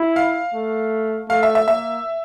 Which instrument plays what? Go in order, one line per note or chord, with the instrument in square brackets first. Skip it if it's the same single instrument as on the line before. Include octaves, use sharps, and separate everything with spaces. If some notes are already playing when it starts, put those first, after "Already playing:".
Already playing: [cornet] E4
[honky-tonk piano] F5
[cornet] A3
[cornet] A3 [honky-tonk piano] F5
[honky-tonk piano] E5
E5
[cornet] A#3 [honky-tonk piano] E5